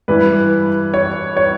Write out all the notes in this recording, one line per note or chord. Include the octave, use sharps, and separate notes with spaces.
G2 E3 G3 B4
C#5
C#5